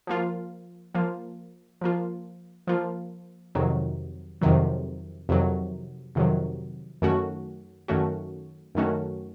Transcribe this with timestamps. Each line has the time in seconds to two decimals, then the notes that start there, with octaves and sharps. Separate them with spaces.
0.07 F3 A#3 F4
0.94 F3 A#3 F4
1.81 F3 A#3 F4
2.67 F3 A#3 F4
3.55 F2 C3 D#3 F#3
4.41 F2 C3 D#3 F#3
5.29 F2 C3 D#3 F#3
6.15 F2 C3 D#3 F#3
7.02 F#2 D#3 A3 C#4 F#4
7.88 F#2 D#3 A3 C#4 F#4
8.75 F#2 D#3 A3 C#4 F#4